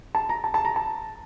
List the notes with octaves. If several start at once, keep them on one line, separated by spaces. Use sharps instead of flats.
A5
A#5
A5
A5
A#5
A5